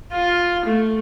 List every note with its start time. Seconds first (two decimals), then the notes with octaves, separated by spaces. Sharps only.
0.11 F4
0.65 A3